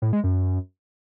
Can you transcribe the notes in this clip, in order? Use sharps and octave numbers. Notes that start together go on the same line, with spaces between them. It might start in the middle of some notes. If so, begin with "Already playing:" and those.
A2
G#3
F#2